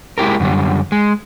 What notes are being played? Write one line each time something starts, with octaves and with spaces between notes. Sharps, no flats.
G#3 E4 G4 A#4
F#2 D3 G3
G#3